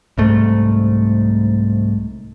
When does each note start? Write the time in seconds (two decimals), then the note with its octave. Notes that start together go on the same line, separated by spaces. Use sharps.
0.18 C2 G#2 A3